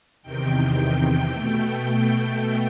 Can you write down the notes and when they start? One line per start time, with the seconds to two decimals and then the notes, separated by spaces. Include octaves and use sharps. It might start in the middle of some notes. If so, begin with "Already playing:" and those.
0.23 E2 C3 D#3 G5
1.32 B2 A3